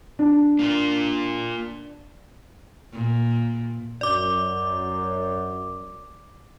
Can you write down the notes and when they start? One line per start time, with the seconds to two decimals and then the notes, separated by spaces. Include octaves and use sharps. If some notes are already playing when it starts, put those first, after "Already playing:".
0.19 D4
0.59 A#3 F4 A#4
2.93 A#2
4.01 F#2 D5 D6